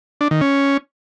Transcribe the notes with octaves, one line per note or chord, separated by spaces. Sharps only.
D4
D#3
C#4